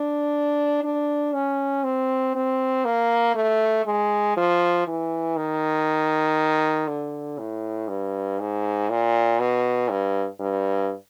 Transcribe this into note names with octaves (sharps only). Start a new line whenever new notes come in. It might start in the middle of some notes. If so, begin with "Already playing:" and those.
Already playing: D4
D4
C#4
C4
C4
A#3
A3
G#3
F3
E3
D#3
D3
A2
G2
G#2
A#2
B2
G2
G2